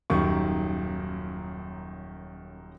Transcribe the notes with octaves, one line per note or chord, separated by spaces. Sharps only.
D#1 F#2 D#3 C#6